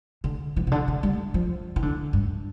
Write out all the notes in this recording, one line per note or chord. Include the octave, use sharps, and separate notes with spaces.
D3
E3
C3
D3
D3
G3
F3
E3
D3
G2